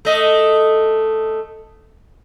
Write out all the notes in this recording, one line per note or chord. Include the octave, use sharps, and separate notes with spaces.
A3 D#5